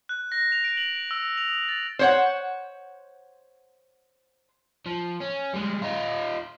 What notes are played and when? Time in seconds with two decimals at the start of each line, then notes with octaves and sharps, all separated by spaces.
0.09 F#6
0.32 A#6
0.52 F7
0.64 D7
0.77 F#7
0.97 D7
1.11 E6
1.22 F7
1.37 F7
1.49 D#6
1.69 A6
1.99 C5 C#5 F#5
4.86 F3
5.20 C#4
5.53 G3 G#3
5.82 D#4 F4